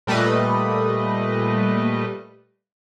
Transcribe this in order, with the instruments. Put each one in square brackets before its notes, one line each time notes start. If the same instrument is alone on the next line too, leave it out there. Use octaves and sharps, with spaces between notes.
[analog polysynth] A#2 G3 A3 B4 D#5